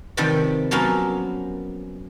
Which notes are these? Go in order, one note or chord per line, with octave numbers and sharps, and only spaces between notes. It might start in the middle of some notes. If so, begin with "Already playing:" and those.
C3 D#3 F3 G4 B4 D5
F3 F#3 A#3 B3 C#4 F5